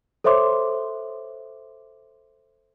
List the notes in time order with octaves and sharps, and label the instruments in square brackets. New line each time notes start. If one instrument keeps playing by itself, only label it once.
[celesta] A4 C5 C#5 E5 C6 D6